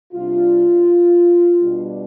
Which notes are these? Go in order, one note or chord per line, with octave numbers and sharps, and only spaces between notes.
C3 G3 D4 F4
B2 G3 D4